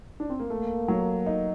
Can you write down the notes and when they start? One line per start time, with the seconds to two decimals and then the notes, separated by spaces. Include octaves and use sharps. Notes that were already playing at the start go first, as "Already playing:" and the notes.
0.20 D4
0.30 C4
0.40 A#3
0.50 A3 A#3
0.88 F#3
1.26 D#4